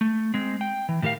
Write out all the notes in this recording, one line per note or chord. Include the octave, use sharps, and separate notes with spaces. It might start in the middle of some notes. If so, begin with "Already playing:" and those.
A3
G#3 C4
G5
E3
A2 D#3 G4 A#4 F5